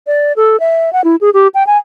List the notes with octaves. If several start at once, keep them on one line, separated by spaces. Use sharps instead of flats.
D5
A4
E5
F#5
E4
G#4
G4
G5
G#5